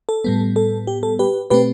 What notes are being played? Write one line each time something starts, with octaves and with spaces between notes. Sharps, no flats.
A4
A2 G3 B3
A4
G4
A4
G4 B4
B2 A3 C4 G4 B4